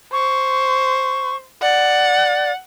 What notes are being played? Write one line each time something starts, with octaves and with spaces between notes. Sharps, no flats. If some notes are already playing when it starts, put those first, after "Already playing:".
C5 C#6
D5 F#5